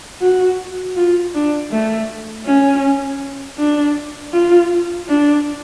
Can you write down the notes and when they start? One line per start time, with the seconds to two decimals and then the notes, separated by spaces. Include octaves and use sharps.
0.21 F#4
0.96 F4
1.35 D4
1.71 A3
2.46 C#4
3.58 D4
4.33 F4
5.08 D4